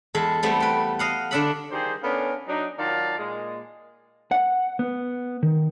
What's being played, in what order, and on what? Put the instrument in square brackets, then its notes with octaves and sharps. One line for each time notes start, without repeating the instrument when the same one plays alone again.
[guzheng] E2 G#3 A4 B5
G3 A3 B3 C4
B4 G5
D#5 F5 F#5
D3 D4 D5 E5 F#5 B5
[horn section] D#3 F3 G3 G4 G#4 C5
B3 C#4 D4 A4 A#4 F5
F#3 D4 D#4
D#3 F#3 F4 D5 F5 A5
A#2 G#3
[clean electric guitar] F#5
B3
D#3